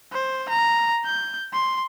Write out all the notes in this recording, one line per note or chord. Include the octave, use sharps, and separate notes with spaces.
C5
A#5
G6
C6